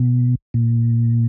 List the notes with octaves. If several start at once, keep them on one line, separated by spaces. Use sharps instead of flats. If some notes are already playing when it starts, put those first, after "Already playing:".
Already playing: B2
A#2